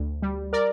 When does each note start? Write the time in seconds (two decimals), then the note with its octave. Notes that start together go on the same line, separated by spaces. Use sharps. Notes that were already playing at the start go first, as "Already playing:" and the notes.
Already playing: D2
0.22 G3
0.53 A#4 D5